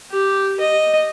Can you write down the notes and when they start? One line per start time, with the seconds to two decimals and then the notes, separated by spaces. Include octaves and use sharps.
0.11 G4
0.60 D#5